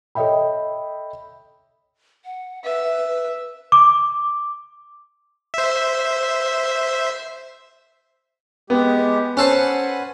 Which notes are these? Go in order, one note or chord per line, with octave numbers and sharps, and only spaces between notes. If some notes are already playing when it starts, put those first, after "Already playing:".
A4 C#5 D#5 E5 G5 B5
F#5
B4 E5
D6
C5 E5
G#3 B3 G4
C#4 A4 B4 C5 F#5 G#5